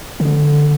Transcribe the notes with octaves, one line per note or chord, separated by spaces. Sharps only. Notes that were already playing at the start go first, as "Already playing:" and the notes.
D3